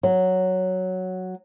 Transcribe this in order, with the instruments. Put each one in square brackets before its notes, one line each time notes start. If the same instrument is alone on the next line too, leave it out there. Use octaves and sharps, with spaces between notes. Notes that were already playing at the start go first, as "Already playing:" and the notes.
[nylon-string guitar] F#3